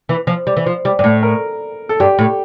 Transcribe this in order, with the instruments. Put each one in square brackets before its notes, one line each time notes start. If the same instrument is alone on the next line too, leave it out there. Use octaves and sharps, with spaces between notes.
[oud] E3
F3
G3
E3
F3
G3
G2
A2
[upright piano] A#4
A4
[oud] G2 [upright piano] G4
[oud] A2